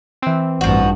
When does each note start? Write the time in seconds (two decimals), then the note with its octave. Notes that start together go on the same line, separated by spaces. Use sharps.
0.22 E3 C4
0.61 A1 G2 F3 F#4